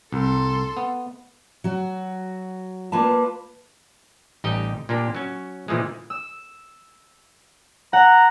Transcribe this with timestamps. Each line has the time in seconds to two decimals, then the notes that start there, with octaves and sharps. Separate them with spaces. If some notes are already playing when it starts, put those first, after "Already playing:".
0.13 C2 A4 C6
0.77 B3
1.64 F#3 F#4
2.92 A#3 F4 B4 D5 A5
4.44 A1 G3 D#4 G4 D#5
4.89 A#2 A#3 D4 G4
5.15 F#3 C#4
5.68 A#2 E3 F3 G#3
6.10 E6
7.93 F#5 A#5